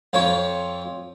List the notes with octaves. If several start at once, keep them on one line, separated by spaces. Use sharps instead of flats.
F2 F3 C#5 C#6